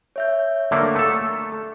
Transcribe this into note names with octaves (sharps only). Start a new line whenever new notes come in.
C#5 E5 G6
D3 A3 A#3
A3 A4